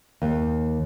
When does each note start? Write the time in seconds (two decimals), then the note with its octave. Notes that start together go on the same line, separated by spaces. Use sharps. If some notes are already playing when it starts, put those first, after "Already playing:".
0.22 D#2